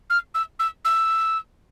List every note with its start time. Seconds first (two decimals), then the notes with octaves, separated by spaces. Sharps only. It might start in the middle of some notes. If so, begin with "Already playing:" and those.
0.10 F6
0.35 E6
0.60 E6
0.85 E6